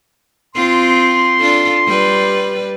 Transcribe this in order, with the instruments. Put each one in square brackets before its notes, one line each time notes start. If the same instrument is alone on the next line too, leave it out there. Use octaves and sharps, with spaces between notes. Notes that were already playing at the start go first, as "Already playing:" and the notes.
[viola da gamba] C4 F4 [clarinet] C6
[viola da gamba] D4 F4 A4
G3 B4